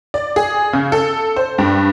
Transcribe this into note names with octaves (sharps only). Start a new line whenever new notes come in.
D5
G#4
C#3
A4
C5
G2